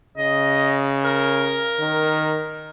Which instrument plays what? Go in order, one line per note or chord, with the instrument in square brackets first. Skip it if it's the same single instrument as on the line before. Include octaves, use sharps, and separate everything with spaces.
[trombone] C#3 [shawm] D#5
[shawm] A#4
[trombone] D#3